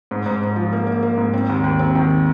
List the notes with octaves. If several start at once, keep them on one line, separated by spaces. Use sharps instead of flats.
G#2
G#2
G#2
F3
A#3
A#3
A#3
G#2
C4
D#2
D#2
C4
D#3